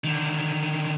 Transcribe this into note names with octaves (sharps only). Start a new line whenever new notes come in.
D3 D#3